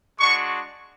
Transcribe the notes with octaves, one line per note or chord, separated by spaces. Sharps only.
G#3 D4 F#4 C#6